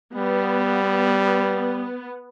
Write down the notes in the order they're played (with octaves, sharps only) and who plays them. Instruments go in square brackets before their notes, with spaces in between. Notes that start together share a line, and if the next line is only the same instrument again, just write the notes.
[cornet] G3 [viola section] B3